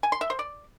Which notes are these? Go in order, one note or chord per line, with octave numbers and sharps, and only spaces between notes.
G#5
C6
E5
C5
D5